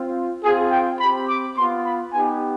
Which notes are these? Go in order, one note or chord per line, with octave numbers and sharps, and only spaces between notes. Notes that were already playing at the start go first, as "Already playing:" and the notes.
Already playing: C4 F4
C4 F4 G#4
G5
C4 G4 B5
D6
B3 F4 C6
B5
B3 D#4 G4 G#5